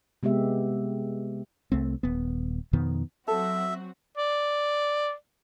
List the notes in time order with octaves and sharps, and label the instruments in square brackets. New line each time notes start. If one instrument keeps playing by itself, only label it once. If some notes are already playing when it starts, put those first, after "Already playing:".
[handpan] C3 G#3 B3 G4 E5
[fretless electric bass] C2 A3 C4
D#1 B3
F2 B2 D#3 B3
[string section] F#3 C4 F#4 [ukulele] A4 [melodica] E5
[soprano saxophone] D5